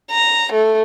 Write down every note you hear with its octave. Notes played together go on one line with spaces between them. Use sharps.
A#5
A3